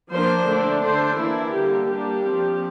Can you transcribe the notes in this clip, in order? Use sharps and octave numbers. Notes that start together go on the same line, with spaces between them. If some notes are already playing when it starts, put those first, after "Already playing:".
F3 A#3 D4 C5
D3 A3 D4
D3 A3 D4 C5
E3 A#3 D4 E4
D3 G3 A#3 G4
G3 A#3 D4 G4
F3 C4